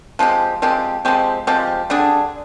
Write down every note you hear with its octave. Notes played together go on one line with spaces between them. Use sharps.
F3 G#3 C4 G4
F3 G#3 C4 G4
F3 G#3 C4 G4
F3 G#3 C4 G4
D3 G3 D4 G#4